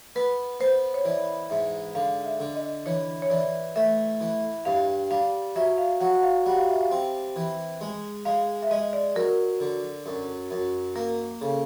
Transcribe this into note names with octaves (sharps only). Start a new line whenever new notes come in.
B3 B4
B3 C5
C#5
E3 D5
G#2 E5
D3 F5
E5
D3
D#5
E3 C#5
C#5
E3 D5
A3 E5
E3
G2 F5
G3 F5
F#3 E5
F5
F#3 F#5
F#5
F5
G3 F#5
F5
E5
F5
C4
E3
G#3
G#3 F5
E5
G#3 D#5
D5
F#3 A#4
D3
F#2
F#2
A#3 A#4
C#3 A4